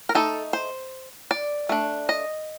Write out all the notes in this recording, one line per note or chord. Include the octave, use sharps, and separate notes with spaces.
A#4
A3 D#4 A4
C5
D5
A3 D4
D#5